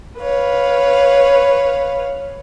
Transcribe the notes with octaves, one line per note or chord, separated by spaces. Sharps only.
B4 C#5 F5